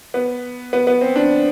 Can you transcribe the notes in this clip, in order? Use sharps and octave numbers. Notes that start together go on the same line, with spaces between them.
B3
B3
B3
C4
D4